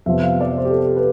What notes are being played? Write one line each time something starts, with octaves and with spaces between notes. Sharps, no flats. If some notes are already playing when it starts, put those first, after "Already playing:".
F2 C3 F3 B3 E5
F5
D5
C5
G4
A4
A4
B4